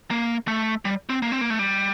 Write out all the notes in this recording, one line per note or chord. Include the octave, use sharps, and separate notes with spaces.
A#3
A3
G3
C4
A#3
C4
A#3
A3
G3